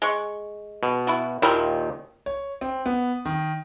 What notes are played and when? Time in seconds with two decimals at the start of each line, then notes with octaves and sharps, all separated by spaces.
0.02 G#3 C#6
0.83 B2
1.07 B3 E4 F#4
1.42 D#2 A#2 D#3 E4 F4
2.26 C#5
2.61 C4
2.86 B3
3.25 D#3